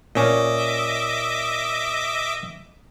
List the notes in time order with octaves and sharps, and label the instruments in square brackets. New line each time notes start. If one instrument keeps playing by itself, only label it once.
[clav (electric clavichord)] A#2 C#4 [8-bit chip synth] D#5 E5 D6